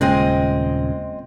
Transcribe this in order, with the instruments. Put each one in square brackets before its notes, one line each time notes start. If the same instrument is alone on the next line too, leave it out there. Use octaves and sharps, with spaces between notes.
[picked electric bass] D#1 A#2 C#3 [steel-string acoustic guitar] G#3 C4 D#5